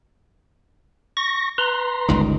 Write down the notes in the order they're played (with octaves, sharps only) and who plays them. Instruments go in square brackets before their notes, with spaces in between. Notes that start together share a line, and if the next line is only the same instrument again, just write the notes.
[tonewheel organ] C#6 A#6
B4 A#5 C6
[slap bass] G1 C#2 D#3